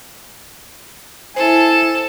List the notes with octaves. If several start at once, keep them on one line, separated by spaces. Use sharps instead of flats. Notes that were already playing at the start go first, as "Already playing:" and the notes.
E4 A4 C5 G#5